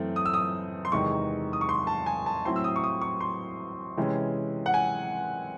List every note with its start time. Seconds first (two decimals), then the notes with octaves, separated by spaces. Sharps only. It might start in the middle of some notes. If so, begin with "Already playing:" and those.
Already playing: F#2 E3 A3 C4
0.16 D#6
0.26 E6
0.34 D#6
0.85 C6
0.92 E2 C3 D#3 G#3 D#4 C#6
1.53 D#6
1.61 C#6
1.69 C6
1.87 A5
2.06 G#5
2.26 A5
2.45 A2 F#3 C4 E4 C6
2.56 E6
2.64 D#6
2.76 C#6
2.84 D#6
3.02 C#6
3.20 C6
3.97 C3 E3 G#3 C#4
4.66 F#5
4.74 G#5